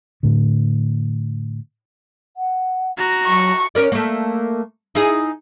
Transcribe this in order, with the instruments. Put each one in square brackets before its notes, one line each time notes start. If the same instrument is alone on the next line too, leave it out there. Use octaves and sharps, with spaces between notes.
[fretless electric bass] A2 D3
[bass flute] F#5
[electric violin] F#4 A#5
[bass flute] F#3 [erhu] C#6
[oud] C#4 A#4 D5
A3 A#3
D#4 E4 G#4